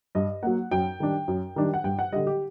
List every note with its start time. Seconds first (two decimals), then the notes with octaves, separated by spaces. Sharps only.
0.15 G2 D#5
0.43 F#3 A#3 F#5
0.71 F#2 G5
1.00 D#3 G3 D4
1.28 F#2
1.56 D#3 G3 D4
1.74 F#5
1.84 G2 G5
1.99 F#5
2.12 D3 G3 D#5
2.27 G4